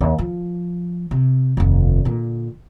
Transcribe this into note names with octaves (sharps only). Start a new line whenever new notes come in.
D#2
F3
C3
F1 D#2
A#2 D3